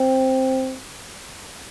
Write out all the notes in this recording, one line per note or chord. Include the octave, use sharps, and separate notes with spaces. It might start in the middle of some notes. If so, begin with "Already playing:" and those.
Already playing: C4